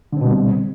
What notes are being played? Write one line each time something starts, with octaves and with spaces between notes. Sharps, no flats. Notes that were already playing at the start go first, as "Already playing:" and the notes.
B2 D3 G3 C4